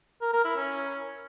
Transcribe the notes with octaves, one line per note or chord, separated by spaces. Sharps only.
A#4
A#4
E4
C#4